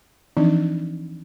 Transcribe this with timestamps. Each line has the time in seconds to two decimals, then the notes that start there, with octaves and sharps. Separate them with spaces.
0.37 E3 F3 C4 D4 D#4